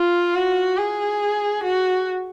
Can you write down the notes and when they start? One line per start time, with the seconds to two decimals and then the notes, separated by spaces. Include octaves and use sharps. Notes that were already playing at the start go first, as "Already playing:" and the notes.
Already playing: F4
0.35 F#4
0.77 G#4
1.63 F#4